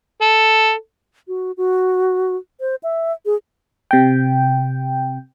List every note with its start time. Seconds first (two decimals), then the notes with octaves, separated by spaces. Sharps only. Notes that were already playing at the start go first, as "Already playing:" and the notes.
0.22 A4
1.28 F#4
1.57 F#4
2.61 C5
2.83 E5
3.26 G#4
3.91 C3 G5